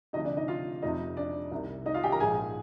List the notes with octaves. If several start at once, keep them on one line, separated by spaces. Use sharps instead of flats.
D2 C3 F3 D#4 D#5
D4 D5
D#4 D#5
F4 F5
F1 F2 C3 D#4 D#5
D4 D5
C2 C3 D#3
D#4 D#5
F4 F5
G4 G5
A#4 A#5
A#1 G#2 F3 G#4 G#5